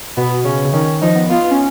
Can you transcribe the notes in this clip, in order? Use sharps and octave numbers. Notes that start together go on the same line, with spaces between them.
B2 B3
C#3 C#4
C#3
D#3 C#4
F3 D#4
B3
B3 F4
C#4